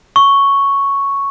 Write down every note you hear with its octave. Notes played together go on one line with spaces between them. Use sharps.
C#6